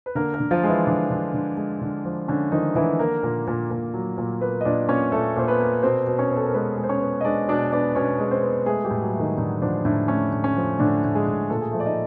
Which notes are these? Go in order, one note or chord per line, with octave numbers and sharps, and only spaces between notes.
B4
D3 A#3 A#4
A#3 A#4
D3
F3 F4
G#3
E3 E4
D3 D4
D3
D3
G#3
D3
F3
D3 C#4
D#3 F3 D#4
D3 E3 E4
A#3 A#4
A#2
A#2
A#2
F#3
A#2
A#3 B3 B4
D#5
A#2 D4 D5
A#2 C#4 C#5
A#2 A3 A4
A#2 C5
B3 B4
A#3
B2 C4 C5
B2
C#4 C#5
B3
A4
A#4
G#3 B3 B4
G#3
C5
C#4 C#5
B3
D#5
G#3 D4 D5
B2 D4 D5
B3 D4 D5
B2 C#4 C#5
G#3
C4 C5
B3
G#3 A3 G#4
G3 G4
A2
F#3 F#4
A3
D#3 D#4
A2 D3 D4
D3 F3 D4
A2 D3 D4
A3 C#4
A2
C#4
F3
A2 D3 D4
A2
G#3 G#4
A2
A#2 A4
G#4
F3 A3 A4
D5
D#4 D#5